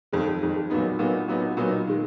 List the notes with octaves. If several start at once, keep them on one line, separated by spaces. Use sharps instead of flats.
F2 D#3 G#3
F2 D#3 G#3
A#2 F#3 B3 D#4
A#2 F#3 B3 D#4
A#2 F#3 B3 D#4
A#2 F#3 B3 D#4
D#3 G#3